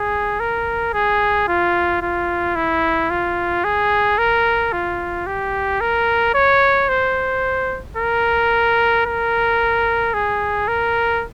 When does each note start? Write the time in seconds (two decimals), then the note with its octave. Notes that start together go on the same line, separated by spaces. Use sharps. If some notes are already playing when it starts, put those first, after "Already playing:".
Already playing: G#4
0.40 A#4
0.94 G#4
1.48 F4
2.02 F4
2.56 E4
3.10 F4
3.64 G#4
4.19 A#4
4.73 F4
5.27 G4
5.81 A#4
6.34 C#5
6.89 C5
7.97 A#4
9.06 A#4
10.14 G#4
10.68 A#4